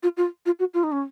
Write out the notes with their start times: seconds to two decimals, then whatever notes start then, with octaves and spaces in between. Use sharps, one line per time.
0.03 F4
0.17 F4
0.46 F4
0.59 F#4
0.74 F4
0.84 D#4
0.92 C#4